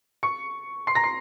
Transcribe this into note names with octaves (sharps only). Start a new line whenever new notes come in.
C#6 C#7
C6 C7
A#5 A#6
C6 C7